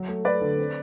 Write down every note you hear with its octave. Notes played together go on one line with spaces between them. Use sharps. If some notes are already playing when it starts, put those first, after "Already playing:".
Already playing: F#3
A3
A3 B4 D5
D3
C4